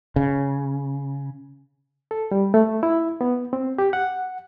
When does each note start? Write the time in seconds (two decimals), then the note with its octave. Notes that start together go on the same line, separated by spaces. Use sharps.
0.16 C#3
2.11 A4
2.31 G3
2.54 A3
2.83 E4
3.21 B3
3.53 C4
3.78 G4
3.93 F#5